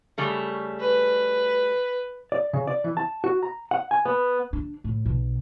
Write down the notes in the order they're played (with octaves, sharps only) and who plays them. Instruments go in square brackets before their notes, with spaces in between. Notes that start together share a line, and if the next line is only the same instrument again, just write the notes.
[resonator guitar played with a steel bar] C#3 G3 A3
[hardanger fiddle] B4
[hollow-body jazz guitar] D5
C#3
D5
E3
A5
F#4
A#5
F#5
G#5
B3
[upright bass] D4
A2
B1